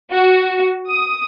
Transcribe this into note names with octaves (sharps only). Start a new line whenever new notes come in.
F#4
D#6